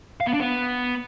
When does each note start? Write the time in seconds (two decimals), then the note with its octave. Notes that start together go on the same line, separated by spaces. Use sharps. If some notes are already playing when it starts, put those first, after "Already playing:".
0.20 F5
0.27 B3
0.33 D4
0.40 B3